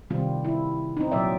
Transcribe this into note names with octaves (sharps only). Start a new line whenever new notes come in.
C3 D#3 G3 C4 F4
E4
C4 D#4
A#2 F#3 D5 E5